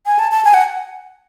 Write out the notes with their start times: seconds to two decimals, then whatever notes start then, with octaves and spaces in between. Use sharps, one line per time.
0.06 G#5
0.19 A5
0.31 A5
0.45 G#5
0.54 F#5